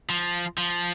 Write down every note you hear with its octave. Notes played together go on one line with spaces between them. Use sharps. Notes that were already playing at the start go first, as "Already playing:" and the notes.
F3
F3